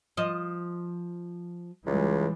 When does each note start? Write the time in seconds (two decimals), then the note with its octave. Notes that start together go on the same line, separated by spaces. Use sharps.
0.17 F3 D#5
1.87 C#2 E3 G3 G#3